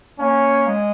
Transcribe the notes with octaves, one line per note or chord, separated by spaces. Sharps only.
A#3 C#4
G#3